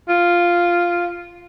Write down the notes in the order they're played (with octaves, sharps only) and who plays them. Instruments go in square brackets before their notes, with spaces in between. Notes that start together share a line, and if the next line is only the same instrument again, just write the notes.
[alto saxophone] F4